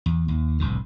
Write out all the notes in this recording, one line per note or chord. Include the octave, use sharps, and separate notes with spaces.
E2
D#2
F1 C2 A2 D3